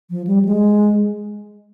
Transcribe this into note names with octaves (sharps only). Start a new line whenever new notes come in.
F3
G3
G#3